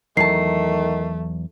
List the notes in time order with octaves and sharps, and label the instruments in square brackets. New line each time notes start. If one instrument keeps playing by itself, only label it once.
[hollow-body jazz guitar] E2 F#3 A5 [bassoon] D#3 [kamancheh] A3 [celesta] C7